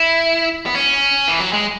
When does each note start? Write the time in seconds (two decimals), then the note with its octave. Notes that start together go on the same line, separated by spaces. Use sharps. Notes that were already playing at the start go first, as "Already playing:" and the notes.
Already playing: E4
0.66 B3
0.75 C#4
1.28 E3
1.40 F#3
1.53 G#3